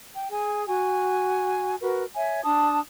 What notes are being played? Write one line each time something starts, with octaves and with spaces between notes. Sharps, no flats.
G5
G#4 G#5
F#4 G#5
F#4 A#4 B4
C#5 E5 G#5
D4 A5 D#6